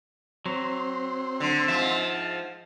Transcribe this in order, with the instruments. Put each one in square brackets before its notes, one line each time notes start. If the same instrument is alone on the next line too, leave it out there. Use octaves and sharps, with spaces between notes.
[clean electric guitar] F#3 [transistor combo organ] C4 C6
[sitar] D3
[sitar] G#2 F3 [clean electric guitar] E5